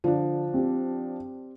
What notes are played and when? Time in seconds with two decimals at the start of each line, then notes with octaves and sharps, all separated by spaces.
0.04 D3 F3 D4
0.54 C4 G4